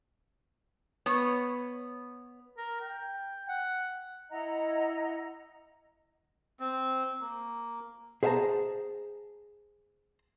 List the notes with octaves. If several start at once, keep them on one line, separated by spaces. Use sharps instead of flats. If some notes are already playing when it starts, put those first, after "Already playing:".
B3 C#5
A#4
G5
F#5
E4 D#5 F#5 A#5
C4
A#3
G#4 C5 E5 F5 A5 A#5